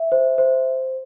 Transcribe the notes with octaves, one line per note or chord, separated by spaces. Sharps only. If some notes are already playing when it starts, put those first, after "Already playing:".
Already playing: E5
C5
C5